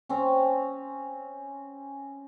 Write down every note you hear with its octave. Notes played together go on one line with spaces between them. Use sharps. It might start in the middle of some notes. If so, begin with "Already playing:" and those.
C4 C#4